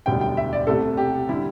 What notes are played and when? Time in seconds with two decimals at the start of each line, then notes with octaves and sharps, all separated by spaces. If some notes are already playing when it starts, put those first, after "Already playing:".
0.06 E1 D2 D3 G3 G5
0.21 G5
0.37 E5
0.53 D5
0.67 C2 C3 A3 A4
0.97 G4
1.29 D3 G3 E4